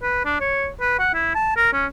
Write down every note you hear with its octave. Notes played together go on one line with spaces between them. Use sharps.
B4
D4
C#5
B4
F#5
E4
A5
A#4
C#4